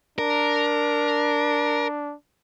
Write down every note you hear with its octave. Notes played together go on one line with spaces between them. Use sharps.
D4 A#4